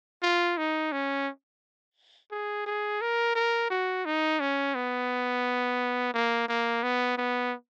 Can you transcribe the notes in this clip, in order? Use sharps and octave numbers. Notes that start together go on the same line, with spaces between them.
F4
D#4
C#4
G#4
G#4
A#4
A#4
F#4
D#4
C#4
B3
A#3
A#3
B3
B3